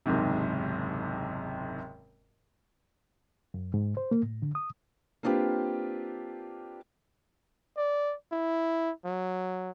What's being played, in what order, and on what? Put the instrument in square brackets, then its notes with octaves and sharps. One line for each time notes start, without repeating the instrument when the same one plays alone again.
[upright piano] F#1 D#2 G#2 C3
[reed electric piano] F#2
G#2
C5
A#3
A2
D3
D#6
[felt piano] A#3 C4 D4 F4 G4 B4
[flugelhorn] D5
E4
F#3